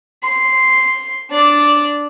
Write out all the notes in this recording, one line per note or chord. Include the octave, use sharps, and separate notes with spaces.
C6
D4 D5